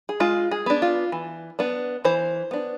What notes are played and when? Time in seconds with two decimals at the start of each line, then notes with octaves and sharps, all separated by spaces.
0.09 G#4
0.20 G#3 F4
0.51 G#4
0.66 B3 D4
0.82 F4
1.12 E3
1.59 B3 D4
2.05 E3 C5
2.51 B3 D4